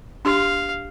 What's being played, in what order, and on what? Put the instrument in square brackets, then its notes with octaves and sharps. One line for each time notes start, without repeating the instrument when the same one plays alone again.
[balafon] D4 G4 C6 [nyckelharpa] F5